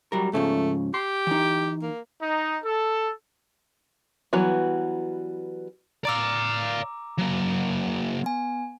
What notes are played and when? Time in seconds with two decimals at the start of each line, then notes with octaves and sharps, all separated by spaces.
0.12 F#3 G3 A#4
0.33 G#2 C#3 F3 A3
0.94 G4 C6
1.27 E3 D#4
1.82 A#3
2.21 D#4
2.64 A4
4.33 E3 F#3 G3 B3 F#4
6.05 D5 F5 A#5 D6 E6
7.19 F#3 A#3
8.24 B3 G#5